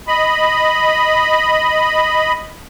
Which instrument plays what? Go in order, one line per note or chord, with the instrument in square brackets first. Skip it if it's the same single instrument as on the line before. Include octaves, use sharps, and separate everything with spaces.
[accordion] D#5 B5